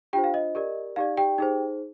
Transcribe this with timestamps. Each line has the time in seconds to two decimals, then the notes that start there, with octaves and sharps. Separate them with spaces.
0.13 D4 F4 G4 C5 G5
0.24 F5
0.34 D#5
0.55 G4 A#4 D5
0.96 D#4 G4 D5 F5
1.17 G4 G5
1.38 D#4 G#4 C5